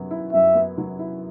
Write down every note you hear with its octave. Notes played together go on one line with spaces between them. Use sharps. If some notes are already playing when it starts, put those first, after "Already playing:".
Already playing: F#2 F#3 B3
E4
F#2 E5
B3
F#3
E4